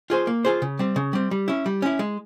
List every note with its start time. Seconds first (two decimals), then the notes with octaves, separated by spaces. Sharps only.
0.10 F4 G#4 C5
0.27 A#3
0.45 F4 G#4 C5
0.62 C#3
0.79 G3 C4
0.96 C#3
1.13 G3 C4
1.31 G3
1.48 C#4 E4
1.66 G3
1.82 C#4 E4
1.99 G#3